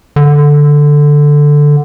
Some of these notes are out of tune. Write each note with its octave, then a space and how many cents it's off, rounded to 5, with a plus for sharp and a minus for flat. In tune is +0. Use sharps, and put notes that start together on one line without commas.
D3 +0